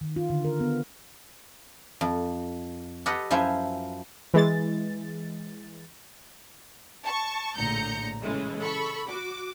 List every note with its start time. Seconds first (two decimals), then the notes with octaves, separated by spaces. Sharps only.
0.01 D#3
0.16 F4
0.30 D3
0.45 A#4
0.60 B3
2.01 F2
3.06 G4 A4 B4 D#5 F#5
3.31 F#2 F3 E4 F4 B4 G#5
4.34 E3 G#3 A6
7.02 A5 C#6
7.57 A#1 A2 D3 A#5 G6 C#7
8.22 C#3 E3 G#3 A3
8.60 A4 B5 C#6
9.08 F#4 D6